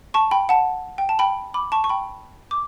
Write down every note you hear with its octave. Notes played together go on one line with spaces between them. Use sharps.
A5 C#6
G5 B5
F#5 A5
G5
A5
G5 B5
B5 D6
A5 C#6
C#6
G5 B5
D6